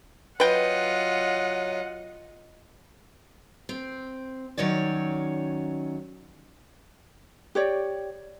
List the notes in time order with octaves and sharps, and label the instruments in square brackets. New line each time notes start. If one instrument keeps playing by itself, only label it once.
[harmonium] F#3 [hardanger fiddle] F4 D#5 [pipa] B4 G5 [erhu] F#5
[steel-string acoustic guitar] C4
D#3 F#3 C#4 C#5 D5
[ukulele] G4 C#5 D5